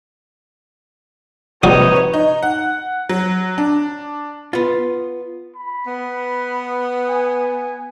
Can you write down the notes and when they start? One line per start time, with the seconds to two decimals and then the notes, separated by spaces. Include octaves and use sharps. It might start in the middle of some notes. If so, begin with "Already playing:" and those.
1.63 A#1 C3 G3 D#4 F#4 B4 C#5 D#5
2.13 D#4
2.43 F#5
3.09 F#3
3.58 D4
4.53 B3 F4
5.56 B5
5.86 B3
7.09 G#5